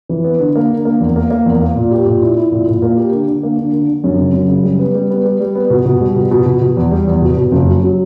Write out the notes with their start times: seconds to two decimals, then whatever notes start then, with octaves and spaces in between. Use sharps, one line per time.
0.09 E3
0.24 B3
0.40 D3
0.55 A#3
0.70 D3
0.85 A#3
1.00 E2
1.16 A#3
1.31 A#3
1.46 E2
1.61 A#3
1.76 A#2
1.91 G4
2.06 A#2
2.22 E4
2.37 E4
2.52 A#2
2.67 A#2
2.82 A#3
2.97 G4
3.12 D3
3.28 D3
3.43 A#3
3.58 D3
3.73 D3
3.88 D3
4.04 F#2
4.18 C#3
4.34 F#2
4.49 C#3
4.64 G3
4.79 B3
4.94 G3
5.10 B3
5.25 G3
5.40 G3
5.55 B3
5.70 B2
5.85 B2
6.00 G3
6.16 B2
6.31 B2
6.46 B2
6.61 B2
6.77 E2
6.91 G3
7.07 E2
7.22 B2
7.37 B2
7.52 F#1
7.67 F#3
7.83 F#3